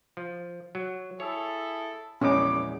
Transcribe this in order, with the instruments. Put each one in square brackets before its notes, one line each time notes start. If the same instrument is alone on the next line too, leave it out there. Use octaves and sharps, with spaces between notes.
[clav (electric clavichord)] F3
F#3
[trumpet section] E4 G#4 A4 [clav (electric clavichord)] C#5
[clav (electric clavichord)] A#1 E2 G#3 [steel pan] C#4 [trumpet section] D#4 B5 D6